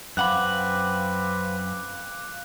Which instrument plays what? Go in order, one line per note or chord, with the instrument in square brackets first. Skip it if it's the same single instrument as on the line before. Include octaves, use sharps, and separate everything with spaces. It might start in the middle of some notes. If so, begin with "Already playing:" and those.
[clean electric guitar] F#2 F#5 B5 [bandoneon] C4 B4 [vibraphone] F5 D6 [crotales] F#6